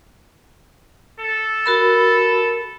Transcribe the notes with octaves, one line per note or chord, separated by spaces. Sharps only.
A4
F#4 A#4 B5